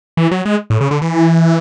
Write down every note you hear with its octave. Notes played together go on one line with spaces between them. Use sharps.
E3
F#3
G#3
A2
C#3
D3
E3